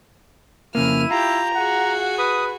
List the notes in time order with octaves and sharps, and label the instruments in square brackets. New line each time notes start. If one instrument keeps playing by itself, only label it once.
[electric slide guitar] F2 C#3 A#3 [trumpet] E4 [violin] F6 D#7
[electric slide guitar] F4 [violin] G4 G6 [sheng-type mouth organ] A#5
[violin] F#4 G#4 [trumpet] F#5
[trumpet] B4 [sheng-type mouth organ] D#6